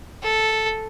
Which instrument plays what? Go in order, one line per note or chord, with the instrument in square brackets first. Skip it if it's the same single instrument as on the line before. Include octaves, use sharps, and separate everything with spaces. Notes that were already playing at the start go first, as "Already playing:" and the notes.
[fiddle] A4